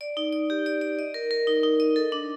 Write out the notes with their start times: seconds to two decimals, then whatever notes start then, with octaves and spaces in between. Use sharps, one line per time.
0.01 D5
0.17 D#4
0.33 D5
0.50 G4
0.66 D5
0.81 D5
0.99 D#5
1.14 A#4
1.31 A#4
1.47 D#4
1.63 D#4
1.80 D#5
1.96 A4
2.12 D4